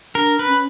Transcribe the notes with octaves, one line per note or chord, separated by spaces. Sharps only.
D4 A#4
B4
C#4